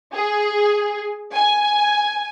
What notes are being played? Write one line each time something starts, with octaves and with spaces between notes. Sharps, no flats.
G#4
G#5